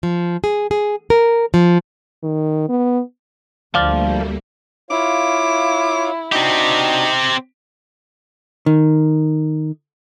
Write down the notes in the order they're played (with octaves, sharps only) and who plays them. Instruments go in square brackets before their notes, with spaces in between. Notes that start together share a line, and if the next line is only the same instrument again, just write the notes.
[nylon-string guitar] F3
G#4
G#4
A#4
F3
[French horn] D#3
B3
[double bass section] D2 [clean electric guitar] F3 [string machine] G3 A3 A#3 [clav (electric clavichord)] D5 F5
[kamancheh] E4 [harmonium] F4 C#5 F5 [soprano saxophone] D6
[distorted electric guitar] C4 G4 [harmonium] D4 F#4 [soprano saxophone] D#4
[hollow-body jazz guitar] D#3